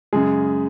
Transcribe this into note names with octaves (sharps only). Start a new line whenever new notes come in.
F#2 C#3 G#3 G#4